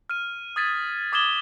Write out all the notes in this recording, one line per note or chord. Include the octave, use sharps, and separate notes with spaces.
F6 D#7
D#6 G#6 A6 B6 D#7
D6 D#6 G#6 E7 G7